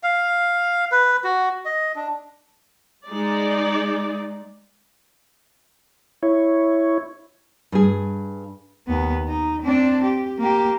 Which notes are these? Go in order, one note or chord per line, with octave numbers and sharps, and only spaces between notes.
F5
B4
F#4
D#5
D4
G#3 D#4 D5
E4 C#5
G2 G#4
D#2 B3
D#4
C4 D4
G4
A#3 G4